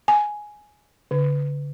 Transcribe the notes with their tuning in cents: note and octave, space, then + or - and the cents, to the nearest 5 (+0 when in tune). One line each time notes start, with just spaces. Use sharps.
G#5 +5
D3 -40